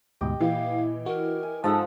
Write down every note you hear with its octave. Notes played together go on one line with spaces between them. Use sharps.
D2 G#2 B2 G4 D#5
A#2 E3 F5
F#4 A#4
G#5
G#2 F3 A4 F#5 A5 D#6